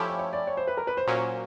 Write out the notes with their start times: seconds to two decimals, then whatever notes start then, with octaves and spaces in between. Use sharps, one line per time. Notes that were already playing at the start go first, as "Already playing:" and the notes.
Already playing: F3 A3 C#4 E4 G4
0.09 C#5
0.19 C#5
0.33 D5
0.47 C#5
0.57 C5
0.67 B4
0.77 A#4
0.87 B4
0.97 C5
1.07 A#2 F#3 A#3 C#4